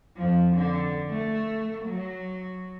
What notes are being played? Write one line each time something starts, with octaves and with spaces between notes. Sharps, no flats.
F2 F3
D3
A3
F#3